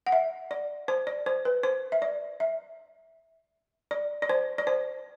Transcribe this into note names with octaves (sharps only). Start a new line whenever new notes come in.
F#5
E5
D5
C5
D5
C5
B4
C5
E5
D5
E5
D5
D5
C5
D5
C5